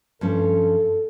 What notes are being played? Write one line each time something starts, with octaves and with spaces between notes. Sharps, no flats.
G2 F3 C#4 A4